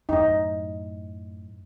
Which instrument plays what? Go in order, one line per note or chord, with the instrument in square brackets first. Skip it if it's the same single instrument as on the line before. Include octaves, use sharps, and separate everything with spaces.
[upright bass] F#2 A2 [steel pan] D#4